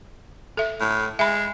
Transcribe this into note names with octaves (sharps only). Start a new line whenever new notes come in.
A4 E5
A2
G#3 E5 B5